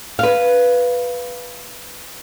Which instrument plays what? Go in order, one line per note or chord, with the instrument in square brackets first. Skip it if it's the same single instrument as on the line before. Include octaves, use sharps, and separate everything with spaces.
[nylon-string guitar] B4 F5